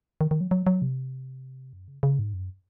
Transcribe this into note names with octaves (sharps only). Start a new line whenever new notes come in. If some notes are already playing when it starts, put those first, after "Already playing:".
D#3
D#3
F#3
F#3
F#3
C3
F#2
C#3
C#3
G#2
F#2